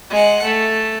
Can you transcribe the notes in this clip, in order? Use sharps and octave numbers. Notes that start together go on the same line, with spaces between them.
G#3 F#5
A3